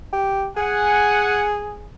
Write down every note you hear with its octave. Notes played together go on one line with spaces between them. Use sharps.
G4
G#4 F#5 G#5